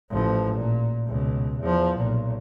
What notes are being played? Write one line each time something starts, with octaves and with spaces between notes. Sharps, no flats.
A1 F3
A#2
C#2 B2
E2 F3
B1 A#2